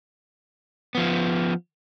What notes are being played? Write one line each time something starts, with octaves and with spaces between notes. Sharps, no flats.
F3 B3